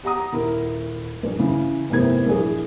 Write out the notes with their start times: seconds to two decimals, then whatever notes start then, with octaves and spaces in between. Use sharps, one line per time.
0.03 G4 F#5 A#5 D#6
0.33 D#1 E4 A#4
1.23 A#1
1.39 C#3 E3
1.90 F1 D#2 C3 E3 B3 G#6
2.27 A#1 E3 G#4